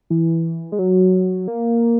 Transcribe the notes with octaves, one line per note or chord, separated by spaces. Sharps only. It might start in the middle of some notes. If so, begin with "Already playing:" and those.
E3
G#3
F#3
A#3